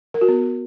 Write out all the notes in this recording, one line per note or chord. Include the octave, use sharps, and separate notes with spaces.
A#4
F#4
B3